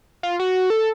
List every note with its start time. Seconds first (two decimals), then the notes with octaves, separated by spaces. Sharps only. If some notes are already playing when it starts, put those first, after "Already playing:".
0.23 F4
0.40 F#4
0.70 A4